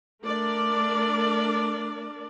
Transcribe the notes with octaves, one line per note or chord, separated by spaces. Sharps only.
A3 D4 A#4 D5